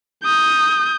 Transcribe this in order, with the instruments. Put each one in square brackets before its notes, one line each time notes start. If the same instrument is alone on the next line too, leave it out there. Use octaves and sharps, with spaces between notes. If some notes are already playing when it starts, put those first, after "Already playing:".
[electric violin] D#6 G6